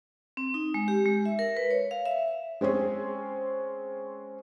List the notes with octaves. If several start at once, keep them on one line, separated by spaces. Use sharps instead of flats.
C4
D#4
G#3
G4
G#3
E5
A#4
B4
C#5
F5
E5
G#3 C4 C#4 G#4